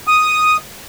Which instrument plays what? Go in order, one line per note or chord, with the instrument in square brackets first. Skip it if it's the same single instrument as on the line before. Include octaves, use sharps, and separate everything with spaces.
[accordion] D#6